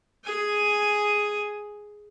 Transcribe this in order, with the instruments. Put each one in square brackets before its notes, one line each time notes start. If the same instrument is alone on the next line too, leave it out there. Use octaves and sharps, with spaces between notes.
[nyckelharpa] G#4 G#5